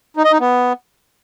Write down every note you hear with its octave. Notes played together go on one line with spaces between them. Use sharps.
D#4
D#5
D#4
B3